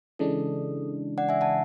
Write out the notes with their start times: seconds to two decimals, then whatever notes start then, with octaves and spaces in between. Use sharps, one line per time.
0.19 C#3 E3 G#3 D4 A4
1.18 D5 F#5
1.29 E5 G#5
1.41 F#5 A5